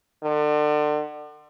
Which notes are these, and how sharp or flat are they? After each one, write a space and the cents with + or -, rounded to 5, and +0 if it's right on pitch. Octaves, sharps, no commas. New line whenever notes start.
D3 +35